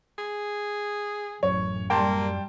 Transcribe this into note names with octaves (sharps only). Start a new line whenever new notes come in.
G#4
A1 F#2 C#5
G3 A#3 G5 A5 C6